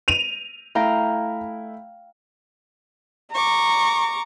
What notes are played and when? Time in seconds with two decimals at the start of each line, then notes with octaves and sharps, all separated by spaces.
0.08 D#7 F7
0.75 A3 E4 F5 G5 A#5
3.35 A#5 C#6 D6